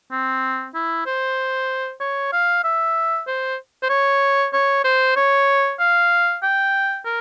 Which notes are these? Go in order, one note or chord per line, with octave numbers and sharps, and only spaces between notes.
C4
E4
C5
C#5
F5
E5
C5
C5
C#5
C#5
C5
C#5
F5
G5
A#4